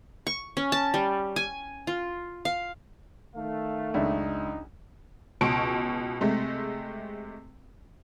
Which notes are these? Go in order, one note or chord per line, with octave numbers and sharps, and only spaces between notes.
C#6
C#4
A5
G3
G#5
F4
F5
D#3 A3 F5
C#2 F#2 D4 D#4 E5
C#2 B2 A5 C#6 D7
C3 G#3 A3